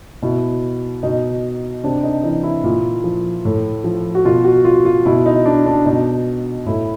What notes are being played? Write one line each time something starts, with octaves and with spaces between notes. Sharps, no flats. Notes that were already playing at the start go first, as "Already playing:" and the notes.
B2 E4
B2 D#4
C3 D4
D#4
E3 D#4
E4
A#2
F3
A2
F3
F#4
B2 F4
F#4
F4
F4
B2 E4
D#4
D4
D4
B2 D#4
A2 E4